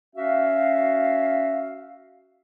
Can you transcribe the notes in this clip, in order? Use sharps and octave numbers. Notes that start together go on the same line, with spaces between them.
C#4 F#4 E5 F5